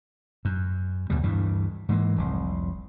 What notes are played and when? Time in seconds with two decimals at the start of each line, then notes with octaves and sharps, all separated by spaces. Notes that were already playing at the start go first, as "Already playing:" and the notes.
0.45 F#2
1.10 D2 B2 G3
1.24 D2 G2 E3
1.89 G#2 E3 A#3
2.17 F1 C2